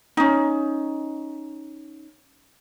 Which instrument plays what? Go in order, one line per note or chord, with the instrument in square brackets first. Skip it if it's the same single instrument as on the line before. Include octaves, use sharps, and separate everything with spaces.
[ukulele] C#4 D#4